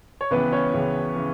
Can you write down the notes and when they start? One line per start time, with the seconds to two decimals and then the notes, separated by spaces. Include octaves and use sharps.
0.21 C#5
0.31 C#2 C#3 E3 B3 B4
0.52 C#4 C#5
0.74 C#2 C#3 E3
1.16 C#3 E3